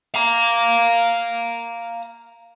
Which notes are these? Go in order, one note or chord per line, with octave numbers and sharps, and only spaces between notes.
F5 A#5